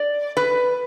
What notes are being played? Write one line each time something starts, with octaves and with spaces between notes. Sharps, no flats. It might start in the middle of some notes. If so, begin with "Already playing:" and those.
Already playing: D5
B4